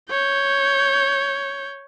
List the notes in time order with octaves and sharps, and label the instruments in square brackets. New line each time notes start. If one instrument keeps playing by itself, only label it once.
[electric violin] C#5 G6